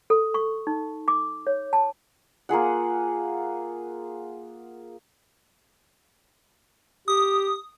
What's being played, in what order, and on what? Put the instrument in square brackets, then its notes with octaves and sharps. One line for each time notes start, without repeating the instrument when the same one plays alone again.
[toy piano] A4
C#6
D#4
D6
C#5
A5
[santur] A#3 F4 G#4 F#5
[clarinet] G4 [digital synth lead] D#6